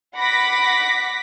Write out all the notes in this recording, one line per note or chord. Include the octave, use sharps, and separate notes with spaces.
F#5 B5 D6 A#6 B6